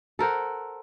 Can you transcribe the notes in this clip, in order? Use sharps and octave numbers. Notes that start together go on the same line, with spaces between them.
A4 A#4 C5 F#5